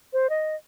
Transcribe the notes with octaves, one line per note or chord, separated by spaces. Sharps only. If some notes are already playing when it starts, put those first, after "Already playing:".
C5
D#5